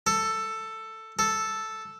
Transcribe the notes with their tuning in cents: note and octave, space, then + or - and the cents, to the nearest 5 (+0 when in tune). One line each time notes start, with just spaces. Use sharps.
A4 +10
A4 +0